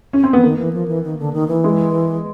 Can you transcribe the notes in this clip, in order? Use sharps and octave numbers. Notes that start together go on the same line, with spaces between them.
C#4
C4
E3 B3
D#3 A#3
E3
F3
E3
D#3
D3
D#3
E3
G#3